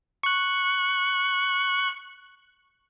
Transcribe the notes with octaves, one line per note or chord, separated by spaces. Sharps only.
C#6 F#6